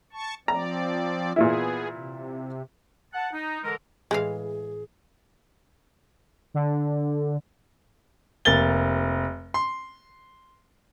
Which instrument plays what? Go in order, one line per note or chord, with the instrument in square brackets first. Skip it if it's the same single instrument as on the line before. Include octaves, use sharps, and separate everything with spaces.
[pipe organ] A5 C#6
[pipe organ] F3 C4 D5 [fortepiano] A#5
[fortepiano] A#2 E3 E4 [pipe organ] B3 G#4
[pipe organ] C3
[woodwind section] F#5 A5
D#4
D3 E3 G#3 A4 A#4
[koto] A2 E3 F5 [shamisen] G#3 [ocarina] G#4
[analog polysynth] D3
[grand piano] F1 A#3 A6 G7
C6